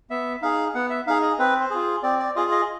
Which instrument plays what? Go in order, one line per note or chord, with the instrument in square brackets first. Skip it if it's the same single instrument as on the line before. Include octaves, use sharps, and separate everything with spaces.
[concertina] B3 E5
D#4 G#4 F5
B3 F#5
E5
D#4 G#4 F5
D#5
C4 B4
C5
F4 G#4
C4 D5
D5
F4 G#4 D#5
D#5